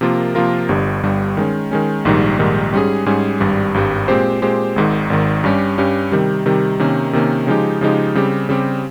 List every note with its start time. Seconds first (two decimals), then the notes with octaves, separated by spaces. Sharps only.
0.01 C3 F3 A#3 F4 A#4
0.35 C3 F3 A#3 F4 A#4
0.69 G1 G2 G3
1.03 G1 G2 G3
1.37 D#3 G#3 C#4
1.71 D#3 G#3 C#4
2.05 A#1 G#2 D#3 G3
2.39 A#1 G#2 D#3 G3
2.73 G#2 G3 C#4 G#4
3.06 G#2 G3 C#4 G#4
3.40 G#1 G2 G3
3.74 G#1 G2 G3
4.08 A#2 G#3 C4 G4 C5
4.42 A#2 G#3 C4 G4 C5
4.76 G#1 G#2 D#3
5.10 G#1 G#2 D#3
5.44 G2 G3 C#4 G4
5.78 G2 G3 C#4 G4
6.12 C3 D#3 G3
6.46 C3 D#3 G3
6.79 C3 D#3 A#3 C#4
7.13 C3 D#3 A#3 C#4
7.47 C#3 F3 G#3 D#4 G4
7.81 C#3 F3 G#3 D#4 G4
8.15 C#3 G3 C4 G4
8.49 C#3 G3 C4 G4